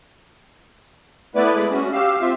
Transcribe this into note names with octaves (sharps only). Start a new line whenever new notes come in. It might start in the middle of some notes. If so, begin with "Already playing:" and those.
A3 B3 E4 B4 D5
G#3 G#4 B5
C#4 F#4
G4 F5 E6
C4 F4 E5